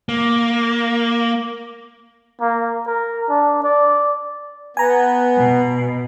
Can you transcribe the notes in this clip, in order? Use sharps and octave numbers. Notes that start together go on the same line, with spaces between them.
A#3
A#3
A#4
D4
D5
B3 G#5 A#5
B2